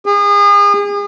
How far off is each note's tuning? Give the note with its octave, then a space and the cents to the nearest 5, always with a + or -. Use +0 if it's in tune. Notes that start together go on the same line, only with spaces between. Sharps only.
G#4 -35